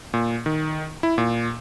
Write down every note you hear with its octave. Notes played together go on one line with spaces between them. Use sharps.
A#2
D#3
E4
A#2